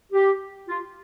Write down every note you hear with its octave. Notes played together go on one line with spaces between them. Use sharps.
G4
F4